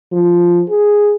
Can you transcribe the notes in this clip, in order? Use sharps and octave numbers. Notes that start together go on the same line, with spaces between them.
F3
G#4